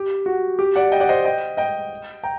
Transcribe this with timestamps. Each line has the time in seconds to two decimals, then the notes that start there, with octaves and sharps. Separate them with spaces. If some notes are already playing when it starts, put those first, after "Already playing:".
Already playing: G4
0.26 F#4
0.59 G4
0.76 D5 F#5
0.92 D#5 G5
1.00 D5 F#5
1.09 C5 D#5
1.25 D#5 G5
1.57 D#5 G5
2.23 G5 A#5